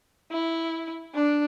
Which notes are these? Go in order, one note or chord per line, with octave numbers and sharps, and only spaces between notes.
E4
D4